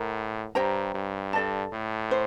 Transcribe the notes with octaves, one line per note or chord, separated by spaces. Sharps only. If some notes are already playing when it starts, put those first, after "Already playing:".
Already playing: A2 A#4 F#5 A#5
G2 G4 C5 G5 A#5
G2
A4 D5 A5
A2
C5